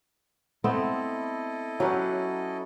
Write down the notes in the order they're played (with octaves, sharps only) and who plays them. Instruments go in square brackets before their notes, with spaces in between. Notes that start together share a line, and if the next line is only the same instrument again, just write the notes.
[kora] A3 B3 C4 [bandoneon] E4 A4 D#5
[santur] F#3 [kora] C#4 G4 B4